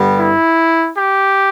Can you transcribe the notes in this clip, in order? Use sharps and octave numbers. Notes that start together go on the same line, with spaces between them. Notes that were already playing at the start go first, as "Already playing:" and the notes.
Already playing: G2 D3 G3 B3
E4
G4